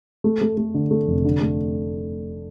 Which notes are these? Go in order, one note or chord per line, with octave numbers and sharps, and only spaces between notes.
A3
A3
A3
D3
A3
F1
D3
A3